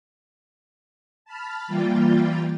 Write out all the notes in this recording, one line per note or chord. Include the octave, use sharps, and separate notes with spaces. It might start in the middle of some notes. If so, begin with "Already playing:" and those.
A5 B5 F6
E3 G3 A#3 F4 G5 A6